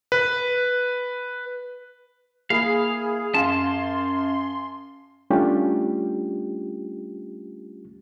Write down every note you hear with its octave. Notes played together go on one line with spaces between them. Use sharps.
B4
A#3 E4 G#4 F5 B5
F#2 F5 A5 C6
G3 A3 C#4 D4 F4 G4